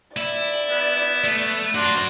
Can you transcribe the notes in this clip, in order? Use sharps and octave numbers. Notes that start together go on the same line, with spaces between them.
E4 D5
B3
A3
D4 F#4 A#4 D5 C6